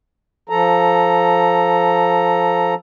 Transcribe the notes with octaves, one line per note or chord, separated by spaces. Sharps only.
F3 A4 A#5